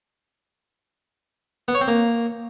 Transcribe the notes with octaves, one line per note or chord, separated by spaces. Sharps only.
B3
C#5
C4
A#3